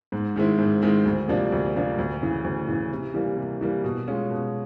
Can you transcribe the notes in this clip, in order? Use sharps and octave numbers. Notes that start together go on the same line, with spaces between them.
G#2
D#3 G#3 C4 E4
G#2
D#3 G#3 C4 E4
D2
C3 F3 A#3 D4
D2
C3 F3 A#3 D4
D2
C#3 E3
D2
C#3 E3
C3
E3 G3 A#3
C3
E3 G3 A#3
B2
G#3 C#4 F4
B2